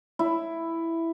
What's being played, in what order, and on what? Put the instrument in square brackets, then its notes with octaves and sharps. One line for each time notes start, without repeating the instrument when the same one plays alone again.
[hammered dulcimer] E4